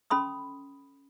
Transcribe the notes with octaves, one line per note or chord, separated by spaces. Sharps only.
C#4 A4 B5 C6 D#6